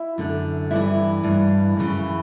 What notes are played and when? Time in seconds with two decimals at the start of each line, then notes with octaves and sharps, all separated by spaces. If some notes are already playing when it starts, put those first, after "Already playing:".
Already playing: E4 E5
0.18 F#2 D3
0.71 G2 E3 E4 E5
1.23 G2 E3
1.77 F#2 C#3 E3